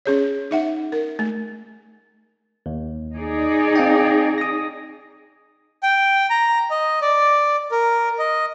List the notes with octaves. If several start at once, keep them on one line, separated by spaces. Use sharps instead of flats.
C#4 G#4 C#5
D#4 E5 F#5
A#4
A3
D#2
D#4 G#4 D5
C4 F5 G5
D#6 A#6
G5
A#5
D#5
D5
A#4
D#5